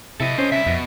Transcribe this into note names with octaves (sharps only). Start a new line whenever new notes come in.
C3 E4 A4 D#5
C#4 C5
C3 E4 E5
F2 B2